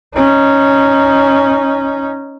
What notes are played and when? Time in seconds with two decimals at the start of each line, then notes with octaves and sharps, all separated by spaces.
0.14 C#4 D#4